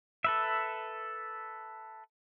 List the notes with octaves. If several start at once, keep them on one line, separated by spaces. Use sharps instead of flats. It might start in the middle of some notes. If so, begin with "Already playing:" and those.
A4 B4 E5